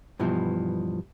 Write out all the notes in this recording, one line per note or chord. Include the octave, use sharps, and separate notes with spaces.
G2 B2 E3 F3